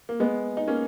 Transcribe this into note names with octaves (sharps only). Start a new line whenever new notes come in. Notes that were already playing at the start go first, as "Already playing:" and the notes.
A#3
G#3 B3
D#4
A#3 C#4